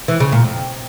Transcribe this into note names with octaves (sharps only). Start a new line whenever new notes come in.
E3
C#3
A#2
F2